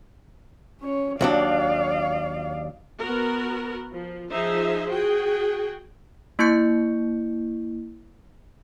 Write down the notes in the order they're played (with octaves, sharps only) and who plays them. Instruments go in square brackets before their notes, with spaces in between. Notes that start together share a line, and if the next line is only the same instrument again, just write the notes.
[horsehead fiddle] C#4 C#5
[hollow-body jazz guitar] D#2 F#3 D4 [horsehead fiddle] D5 F5
[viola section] B3 F#4 A#4
F3
F3 D#4 G#4 C5 E5
F#4 G#4 G5
[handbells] A#3 E4 C#6 G6 C#7